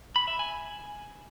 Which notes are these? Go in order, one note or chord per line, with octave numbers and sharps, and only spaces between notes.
B5
E5
G#5